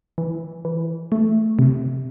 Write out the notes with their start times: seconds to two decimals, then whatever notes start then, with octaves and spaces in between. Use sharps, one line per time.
0.18 E3
0.65 E3
1.12 A3
1.59 C3